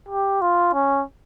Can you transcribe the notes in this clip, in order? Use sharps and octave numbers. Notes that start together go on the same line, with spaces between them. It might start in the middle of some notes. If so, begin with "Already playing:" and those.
G4
F4
C#4